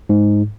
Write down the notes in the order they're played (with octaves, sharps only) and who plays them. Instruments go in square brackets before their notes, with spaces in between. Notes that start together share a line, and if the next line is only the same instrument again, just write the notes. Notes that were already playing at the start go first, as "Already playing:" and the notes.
[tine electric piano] G#2